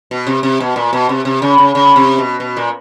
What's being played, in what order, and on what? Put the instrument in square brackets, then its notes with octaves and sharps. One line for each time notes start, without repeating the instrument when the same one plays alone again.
[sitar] B2
C3
C3
B2
A#2
B2
C3
C3
C#3
C#3
C#3
C3
B2
B2
A#2